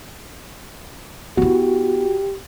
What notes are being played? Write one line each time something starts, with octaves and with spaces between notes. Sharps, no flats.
B3 E4 F#4 G4